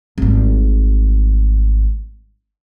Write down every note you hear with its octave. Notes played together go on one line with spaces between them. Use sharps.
G#1 G3